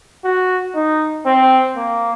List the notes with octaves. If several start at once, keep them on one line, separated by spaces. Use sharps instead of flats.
F#4
D#4
C4
A#3